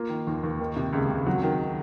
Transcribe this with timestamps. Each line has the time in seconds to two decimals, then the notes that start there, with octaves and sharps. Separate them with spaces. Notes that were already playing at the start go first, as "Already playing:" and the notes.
Already playing: A#3 F4
0.09 D#3
0.27 D#2
0.43 D#2
0.60 D#3
0.76 C3
0.93 C#2
1.10 C#2
1.27 F#3
1.43 D#3